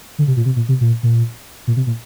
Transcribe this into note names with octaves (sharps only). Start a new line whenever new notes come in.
D3
C3
A#2
C3
A#2
C3
A#2
A#2
A#2
C3
A#2